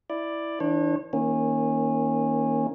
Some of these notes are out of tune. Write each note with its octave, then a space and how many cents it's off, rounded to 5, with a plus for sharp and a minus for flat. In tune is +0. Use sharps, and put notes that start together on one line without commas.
E4 +0 D5 +5
E3 -30 D4 +0 C#5 -40
D#3 +20 A#3 +0 C#4 -20